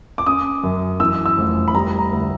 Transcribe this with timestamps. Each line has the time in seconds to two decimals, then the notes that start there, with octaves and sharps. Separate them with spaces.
0.18 D6
0.26 C#4 D#6
0.63 F#2
1.00 E3 E6
1.26 E6
1.37 F1
1.68 B5
1.74 G3 A#5
1.99 A#5
2.11 D2